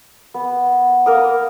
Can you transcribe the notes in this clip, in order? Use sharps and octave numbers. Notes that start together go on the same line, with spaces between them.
B3
A#3 A#4 D#6